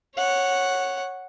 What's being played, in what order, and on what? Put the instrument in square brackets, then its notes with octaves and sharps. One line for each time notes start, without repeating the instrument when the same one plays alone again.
[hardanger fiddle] C#5 F#5